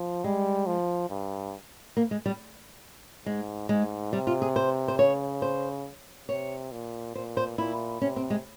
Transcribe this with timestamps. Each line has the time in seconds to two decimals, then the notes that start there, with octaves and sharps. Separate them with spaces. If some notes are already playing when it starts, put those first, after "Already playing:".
Already playing: F3
0.24 G3 G#3
0.67 F3
1.10 G2
1.97 A#3
2.11 G#3
2.26 G3
3.26 G#2 G#3
3.69 G#2 G#3
4.13 C3 G3
4.27 F4
4.42 G#4
4.56 C5
4.88 C5
4.99 C#3 C#5
5.42 C5
6.28 C3 C#5
6.72 A#2
7.15 A#2 C5
7.37 C5
7.58 A#2 E4
8.01 C3 C#4
8.16 C4
8.30 G#3